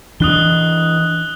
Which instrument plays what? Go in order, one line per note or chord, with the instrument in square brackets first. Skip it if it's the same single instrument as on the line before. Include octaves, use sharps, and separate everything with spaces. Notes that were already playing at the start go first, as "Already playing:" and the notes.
[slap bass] E3 D4 [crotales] D#6 F#6 G7